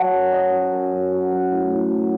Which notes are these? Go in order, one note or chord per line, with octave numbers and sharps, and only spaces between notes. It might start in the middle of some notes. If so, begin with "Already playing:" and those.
Already playing: F#3 F#5 A5
F#2
F#3 D#5
F#3
F#2
F#2
F#3
F#3 F#5
A2
A2
F#3